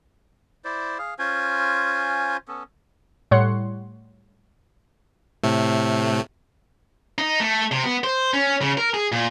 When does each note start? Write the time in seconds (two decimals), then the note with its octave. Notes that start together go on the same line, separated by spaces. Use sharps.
0.65 E4 C5 D5
0.98 G#4 F5
1.19 C#4 F4 C5 G#5
2.48 B3 C#4 A4
3.31 A2 G3 C#5 F#5 C6 C#7
5.43 A2 C3 A3
7.18 D#4
7.40 A3
7.72 C3
7.84 B3
8.04 C5
8.34 C#4
8.61 C#3
8.77 A#4
8.94 G#4
9.12 A#2